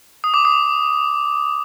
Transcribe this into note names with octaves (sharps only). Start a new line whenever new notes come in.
D#6
D6
D#6